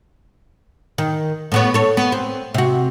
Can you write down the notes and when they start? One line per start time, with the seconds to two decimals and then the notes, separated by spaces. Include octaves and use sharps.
0.98 D#3
1.52 A2 B3 C#5
1.74 A4 C#5
1.97 B3
2.12 C4
2.54 C3 F#4